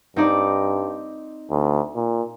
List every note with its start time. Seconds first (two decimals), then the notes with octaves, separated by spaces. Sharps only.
0.16 G2 C4 D#4 D5
1.51 D2
1.95 A#2